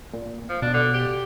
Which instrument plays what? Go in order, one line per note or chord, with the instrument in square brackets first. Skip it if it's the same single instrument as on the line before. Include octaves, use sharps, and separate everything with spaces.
[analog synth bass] A#2
[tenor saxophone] F3
[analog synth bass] B2 [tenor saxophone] D4
[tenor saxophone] D3
G4